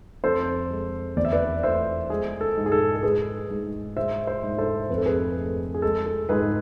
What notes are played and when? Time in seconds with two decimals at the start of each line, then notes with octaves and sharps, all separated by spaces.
0.23 F2 A4 C5
0.71 G#3
1.16 E2 D5
1.25 E5
1.32 B4 D5
1.63 A3 C5 E5
2.10 G#3 G#4
2.41 A4
2.57 G#2
2.66 G#4
2.72 A4
2.96 A4
3.03 G#3 G#4 B4
3.50 G#2
3.97 G#3 C5 E5
4.27 C5 E5
4.43 G#2
4.58 A4 C5
4.89 F2 B4
4.98 A4
5.06 G#4 B4
5.36 A3
5.74 G#4
5.82 G#3 A4
6.06 A4
6.29 G#2 G#4 B4